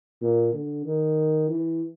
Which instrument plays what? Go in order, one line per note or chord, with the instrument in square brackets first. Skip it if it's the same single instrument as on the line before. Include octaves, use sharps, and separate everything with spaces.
[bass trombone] A#2
D3
D#3
E3